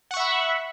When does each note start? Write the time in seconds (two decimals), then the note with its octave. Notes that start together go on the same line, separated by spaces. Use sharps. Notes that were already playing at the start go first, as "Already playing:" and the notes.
0.11 F#5
0.14 C#6
0.17 E5
0.20 B5